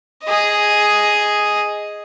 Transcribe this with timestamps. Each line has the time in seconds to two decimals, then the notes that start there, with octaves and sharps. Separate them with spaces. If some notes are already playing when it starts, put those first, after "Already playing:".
0.24 G#4 D#5